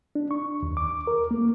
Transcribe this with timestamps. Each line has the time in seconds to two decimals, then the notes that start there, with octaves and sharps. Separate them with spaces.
0.15 D4
0.31 C#6
0.63 D#2
0.77 D6
1.07 A#4
1.31 A#3